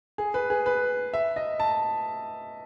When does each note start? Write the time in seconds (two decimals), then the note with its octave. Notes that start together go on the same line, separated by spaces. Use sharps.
0.18 G#4
0.34 B4
0.50 G#4
0.66 B4
1.14 E5
1.36 D#5
1.60 A5